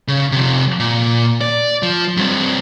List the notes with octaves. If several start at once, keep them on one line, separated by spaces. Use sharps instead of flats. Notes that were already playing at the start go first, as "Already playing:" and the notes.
C#3
C3 F3
A#2
D5
F3
G2 C4